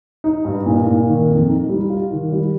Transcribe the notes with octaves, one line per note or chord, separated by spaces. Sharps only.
D#4
G2
A#2
A#2
D#3
F2
D#4
G3
F4
D#3
G3